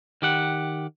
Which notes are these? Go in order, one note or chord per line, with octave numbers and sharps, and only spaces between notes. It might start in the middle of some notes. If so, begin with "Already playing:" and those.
D#3 G4 F#5